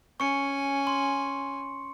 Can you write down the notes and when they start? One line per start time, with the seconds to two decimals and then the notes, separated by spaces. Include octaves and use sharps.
0.20 C#4 G#5 C#6 C#7
0.87 C6